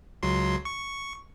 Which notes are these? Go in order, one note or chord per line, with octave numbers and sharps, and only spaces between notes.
C#2 F#3 C6
C#6